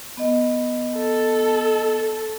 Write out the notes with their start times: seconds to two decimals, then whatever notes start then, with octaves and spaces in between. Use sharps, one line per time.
0.17 B3 D#5
0.97 A4